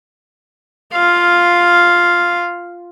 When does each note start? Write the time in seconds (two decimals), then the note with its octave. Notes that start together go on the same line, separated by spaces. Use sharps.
0.93 F4 F5